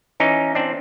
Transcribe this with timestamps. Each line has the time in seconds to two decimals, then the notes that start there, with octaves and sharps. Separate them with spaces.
0.20 E3 C#4 D#4
0.55 C4 D4